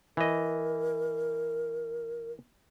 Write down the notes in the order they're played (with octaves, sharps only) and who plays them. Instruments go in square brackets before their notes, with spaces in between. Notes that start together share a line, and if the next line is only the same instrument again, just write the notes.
[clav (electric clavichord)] E3 D#5 [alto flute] A#4